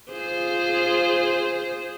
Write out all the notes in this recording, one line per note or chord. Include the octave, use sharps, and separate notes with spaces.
F4 G#4 C5